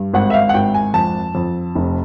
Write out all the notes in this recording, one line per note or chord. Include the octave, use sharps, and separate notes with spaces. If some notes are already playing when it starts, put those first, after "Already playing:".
Already playing: G2
G#1 F#5
E5
F5
F#5
G#1 G5
G#5
F2 A5
F2
F1